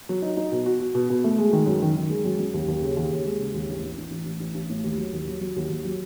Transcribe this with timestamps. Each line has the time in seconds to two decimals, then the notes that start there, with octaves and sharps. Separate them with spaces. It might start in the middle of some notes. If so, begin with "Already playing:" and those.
0.09 F#3
0.22 D#4
0.37 D#4
0.52 B2
0.66 F#4
0.80 F#4
0.95 B2
1.10 B2
1.24 A3
1.38 G#3
1.53 D#3
1.66 F#2
1.82 D#3
1.96 D#3
2.10 G#3
2.25 F#2
2.39 F#2
2.54 D#2
2.68 D#2
2.82 C#3
2.97 D#2
3.11 D#2
3.25 G#3
3.39 C#3
3.54 D#2
3.68 A1
3.83 A1
3.98 A1
4.11 A1
4.26 A1
4.40 A1
4.55 A1
4.69 A2
4.84 D#2
4.98 F#3
5.13 D#2
5.27 F#3
5.41 F#3
5.56 D#2
5.69 D#2
5.85 F#3